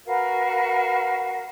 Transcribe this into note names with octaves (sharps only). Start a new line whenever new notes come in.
F#4 A#4 B4 F5